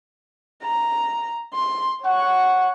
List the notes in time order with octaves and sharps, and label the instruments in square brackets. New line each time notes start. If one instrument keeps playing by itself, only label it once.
[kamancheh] A#5
C6
[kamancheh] C#5 C#6 [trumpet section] F#5